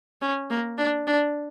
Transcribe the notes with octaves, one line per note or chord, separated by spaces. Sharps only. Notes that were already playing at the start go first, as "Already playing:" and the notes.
C#4
A#3
D4
D4